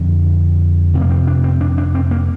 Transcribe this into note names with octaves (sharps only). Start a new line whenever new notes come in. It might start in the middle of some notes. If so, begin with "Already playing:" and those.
Already playing: F2 D3
F2 C3
A#3
C4
D4
C4
D4
D4
C4
A#3